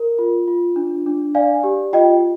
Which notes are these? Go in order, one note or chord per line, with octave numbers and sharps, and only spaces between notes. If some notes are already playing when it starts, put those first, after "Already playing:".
Already playing: A#4
F4
F4
D4
D4
D5 F5 G#5
G4
F4 D#5 G5